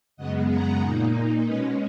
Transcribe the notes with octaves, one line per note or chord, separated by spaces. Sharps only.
F#2 C#3 G#3 B3 D#5 F#5
F#5 A#5
A#2 A#3 D#4
B2 G#3 C#4 B4 D#5